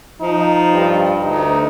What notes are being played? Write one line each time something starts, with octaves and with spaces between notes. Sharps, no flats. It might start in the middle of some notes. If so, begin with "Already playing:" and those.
F3 D#4
G2
D2 D#4